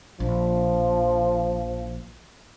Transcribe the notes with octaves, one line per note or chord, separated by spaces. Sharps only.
A#1 F3